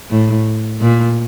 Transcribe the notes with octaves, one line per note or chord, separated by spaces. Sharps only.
A2
A#2